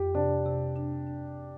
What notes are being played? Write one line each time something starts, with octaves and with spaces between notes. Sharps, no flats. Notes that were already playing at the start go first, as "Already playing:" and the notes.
Already playing: F2 G4
C3 D4
C3
D4
D4